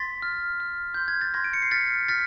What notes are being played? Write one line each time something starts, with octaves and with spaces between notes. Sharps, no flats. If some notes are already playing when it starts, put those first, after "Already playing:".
Already playing: C6 A6 B6
F6
F6
C6 G6
G#6
A6
C6 G#6 A#6
D7
C#7
C7
F6 A6 B6
F6 A6 B6